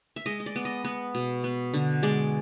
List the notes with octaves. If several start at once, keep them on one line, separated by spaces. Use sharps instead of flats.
E5
G#3 D#5
D#5
D5
B3
D#5
B3
B2
B3
D3
G#3 D5